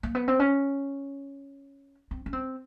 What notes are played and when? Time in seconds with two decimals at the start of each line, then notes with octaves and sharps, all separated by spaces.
0.03 A#3
0.15 B3
0.28 C4
0.39 C#4
2.11 C4
2.26 C#4
2.33 C4